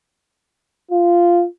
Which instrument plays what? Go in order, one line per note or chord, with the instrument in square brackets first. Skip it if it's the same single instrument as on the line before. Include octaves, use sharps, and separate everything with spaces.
[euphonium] F4